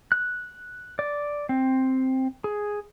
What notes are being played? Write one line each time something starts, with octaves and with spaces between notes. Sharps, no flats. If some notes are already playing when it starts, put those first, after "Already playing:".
F#6
D5
C4
G#4